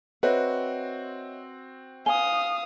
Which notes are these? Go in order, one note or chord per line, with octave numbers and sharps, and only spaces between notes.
C4 F#4 B4 C#5 D#5 E5
F5 G#5 D#6 G7